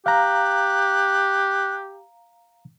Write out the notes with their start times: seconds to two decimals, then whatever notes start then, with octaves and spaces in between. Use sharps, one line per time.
0.06 G4 F5 A#5 F#6